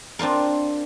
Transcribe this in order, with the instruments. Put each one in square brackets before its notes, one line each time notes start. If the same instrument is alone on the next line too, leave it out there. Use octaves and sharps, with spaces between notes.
[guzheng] C4 D4 F4 A#4